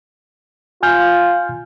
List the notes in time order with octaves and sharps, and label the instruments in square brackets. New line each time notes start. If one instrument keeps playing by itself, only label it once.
[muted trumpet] F4 [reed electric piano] G#5 F6 G6